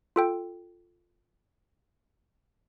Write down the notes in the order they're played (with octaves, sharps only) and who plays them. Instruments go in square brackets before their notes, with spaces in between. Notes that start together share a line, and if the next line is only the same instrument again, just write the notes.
[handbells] F4 A4 G5